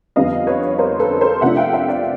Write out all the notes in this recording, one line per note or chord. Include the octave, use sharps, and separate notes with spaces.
F2 D3 G3 B3 D#5 F5
B4 C#5
A#4 C5
A4 B4
A#4 C5
C3 F3 A3 D4 F4 E5 F#5
F5 G5
E5 F#5
D5 E5